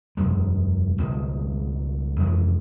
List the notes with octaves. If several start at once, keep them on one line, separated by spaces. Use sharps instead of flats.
E1 F#2 G#3
C#2 B2 D#3 G#3
F2 E3 G#3